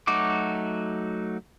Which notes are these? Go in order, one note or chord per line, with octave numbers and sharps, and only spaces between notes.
F#3 A3 D#4 F#4 D6